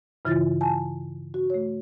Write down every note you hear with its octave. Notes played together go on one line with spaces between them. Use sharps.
G2 C#3 E3 E4 F4 A6
G#5 A5
F#4
A3 C#5